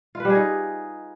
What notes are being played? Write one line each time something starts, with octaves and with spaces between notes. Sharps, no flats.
F4
B4
G3
G#4
D#4